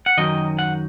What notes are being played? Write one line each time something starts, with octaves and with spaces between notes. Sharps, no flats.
F#5
F#2 D#3 F#3 D#4 D#5
F#5